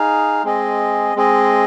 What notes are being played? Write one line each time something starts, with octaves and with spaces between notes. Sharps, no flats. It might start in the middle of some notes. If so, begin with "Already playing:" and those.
Already playing: D#4 G#4 F5
G#3 C4 G#4 D#5
G#3 C4 G#4 D#5